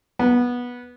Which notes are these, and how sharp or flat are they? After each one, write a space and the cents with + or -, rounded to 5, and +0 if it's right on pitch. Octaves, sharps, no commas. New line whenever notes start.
B3 -15